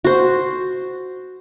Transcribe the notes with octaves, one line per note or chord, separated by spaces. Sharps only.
F#4 C5